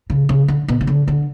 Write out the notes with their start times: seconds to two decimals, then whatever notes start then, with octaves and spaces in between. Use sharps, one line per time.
0.10 C#3
0.29 C#3
0.48 D3
0.68 B2
0.81 C#3
0.87 D3
1.08 D3